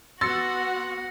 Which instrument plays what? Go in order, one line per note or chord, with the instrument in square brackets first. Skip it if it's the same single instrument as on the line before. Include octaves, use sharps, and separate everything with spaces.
[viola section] B3 F#5 [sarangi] F#4 [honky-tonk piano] C6 E6 A6 [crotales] A#6 C#7